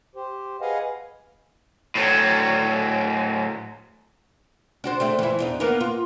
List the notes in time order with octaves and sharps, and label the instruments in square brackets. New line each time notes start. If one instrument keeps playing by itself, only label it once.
[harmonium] G4 C5
G#4 B4 D#5 F5 F#5 G#5
[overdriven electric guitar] A2 F#3
[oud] D4 F#4 C5
A3 C4 D4
E3 E4
E2 D4 D#4
A#3 B3 A#4
F4